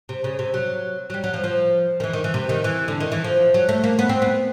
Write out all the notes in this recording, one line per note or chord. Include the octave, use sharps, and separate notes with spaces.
C3
C#3
C3
F#3
F#3
G3
F#3
F3
F3
D#3
E3
D#3
E3
C3
D#3
E3
D3
D#3
E3
F3
F#3
A3
A#3
B3
C4
B3